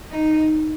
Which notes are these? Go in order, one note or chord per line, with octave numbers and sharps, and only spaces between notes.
D#4